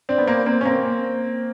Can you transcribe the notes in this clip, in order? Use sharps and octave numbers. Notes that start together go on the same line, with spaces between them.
C4 D4
B3
A#3 C4
A#3 C4
C#4
A#3 C4